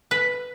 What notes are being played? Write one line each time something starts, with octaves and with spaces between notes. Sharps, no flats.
B4